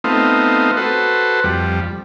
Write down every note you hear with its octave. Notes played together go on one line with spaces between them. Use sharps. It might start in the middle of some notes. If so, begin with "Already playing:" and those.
A3 B3 C4 D#4 F4
F#4 A4 B4 C5
F2 G3